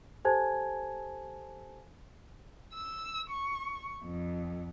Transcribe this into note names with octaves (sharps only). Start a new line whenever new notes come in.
G4 A4 C5 G#5 A5 G#6
E6
C#6
F2